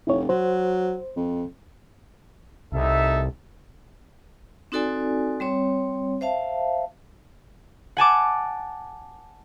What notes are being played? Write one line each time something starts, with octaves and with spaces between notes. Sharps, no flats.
F1 E4 C#5
F#3 C5
F2
C2 D#4 A4 E5
C4 D#4 F#4 A4 D5 G#5
G3 C4 C#5
C5 E5 F5 A5
F#5 G#5 A5 D6